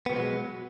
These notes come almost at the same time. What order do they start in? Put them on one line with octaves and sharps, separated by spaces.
B3 B2 F3 G#3 F#3